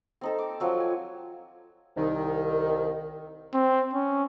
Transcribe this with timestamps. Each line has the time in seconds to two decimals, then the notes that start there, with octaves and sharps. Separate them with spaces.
0.21 C4 D#4 A4
0.38 D6
0.60 F3 F#3 C4
0.80 G#5
1.97 C2 D#3
3.54 C4
3.94 C#4